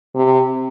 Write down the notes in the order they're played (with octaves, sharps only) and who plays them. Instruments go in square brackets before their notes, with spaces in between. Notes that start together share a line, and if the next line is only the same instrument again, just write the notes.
[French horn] C3